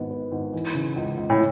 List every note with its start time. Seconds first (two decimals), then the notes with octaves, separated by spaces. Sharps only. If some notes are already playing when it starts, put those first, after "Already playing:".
Already playing: G#1 B3
0.11 B3
0.32 G#1
0.53 E3
0.75 C#3
0.96 C#2
1.17 C#2
1.30 A2